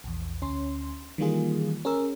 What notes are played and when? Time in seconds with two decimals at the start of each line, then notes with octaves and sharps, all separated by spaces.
0.04 A#1 E2
0.41 D2 C#4 C6
1.18 D#3 E3 G3 A#3 F4 G#4
1.85 C#4 G#4 A#4 E6